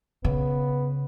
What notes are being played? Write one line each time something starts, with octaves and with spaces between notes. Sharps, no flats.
C#3 B3